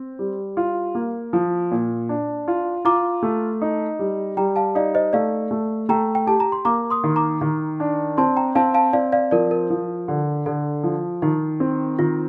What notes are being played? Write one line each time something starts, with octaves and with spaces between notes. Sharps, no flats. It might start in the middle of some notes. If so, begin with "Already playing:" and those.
Already playing: C4
G3
F4
A#3
F3
A#2
D4
F4
F4 A#5 D6
A3
D#4
G3
G3 G5 A#5
F5 A5
D#4 D5 F5
C5 D#5
A3 D5 F5
A3
A3 G5 A#5
G5
G4 A5
A#5
C6
A#3 A#5 D6
C6 D#6
D#3
A#5 D6
D#3
D4
C4 A5 C6
G5 A#5
C4 F5 A5
F5 A5
C4 D5 F5
D5 F5
F3 A#4 D5
A#4
F3
D3
D3 A4
F3
D#3 D#4
C4
D#3 F4